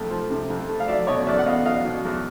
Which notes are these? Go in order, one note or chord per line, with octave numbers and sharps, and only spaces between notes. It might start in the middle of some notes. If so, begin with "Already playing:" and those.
Already playing: F2 C3 A3
F3
C3
F2
A3
F5
F#3 D5 E5
B2 C#5 D#5
E2 D5 E5
F#5
B3 D#5 F5
F#3 D#5 F5
B2
E2